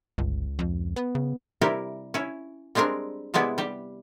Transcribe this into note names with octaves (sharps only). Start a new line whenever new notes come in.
G1 C#2
F2
B3
C#3
C3 G3 E4 G4 A#4
C#4 E4
G3 G#3 C4 D4 A#4
C3 G3 G#3 B3 E4 D5
G3 G4